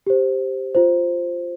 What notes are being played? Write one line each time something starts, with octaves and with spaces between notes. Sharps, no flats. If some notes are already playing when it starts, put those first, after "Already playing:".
G4 C5
F4 C5